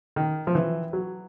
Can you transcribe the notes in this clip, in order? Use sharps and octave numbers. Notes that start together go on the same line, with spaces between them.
D#3
F3
E3
F#3